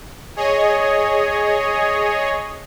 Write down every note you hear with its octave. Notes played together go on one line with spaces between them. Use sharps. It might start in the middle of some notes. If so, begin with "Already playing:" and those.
G#4 C#5 D#5